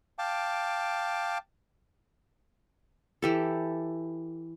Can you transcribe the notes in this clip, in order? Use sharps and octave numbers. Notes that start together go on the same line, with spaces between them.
F5 G5 A5 D6
E3 G4 A4